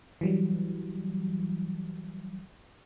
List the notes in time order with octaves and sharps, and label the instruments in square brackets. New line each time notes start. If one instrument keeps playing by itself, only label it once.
[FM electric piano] E3 F#3 G3